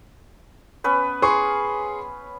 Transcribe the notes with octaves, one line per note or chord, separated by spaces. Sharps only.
B3 C#4 B4
G#4 C6 C#6